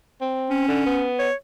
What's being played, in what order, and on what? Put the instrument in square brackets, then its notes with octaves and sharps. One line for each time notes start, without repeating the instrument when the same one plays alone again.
[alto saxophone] C4
[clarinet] C#4
[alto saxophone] D3
B3
[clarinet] C#5